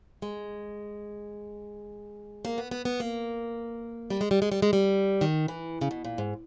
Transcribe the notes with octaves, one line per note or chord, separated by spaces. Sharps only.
G#3
A#3
B3
B3
B3
A#3
G3
G#3
G3
G#3
G3
G#3
G3
D#3
E3
C#3
B2
A#2
G#2